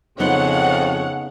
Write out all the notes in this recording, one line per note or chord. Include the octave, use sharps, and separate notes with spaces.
F2 C#3 B3 D#4 C5 C#5 F#5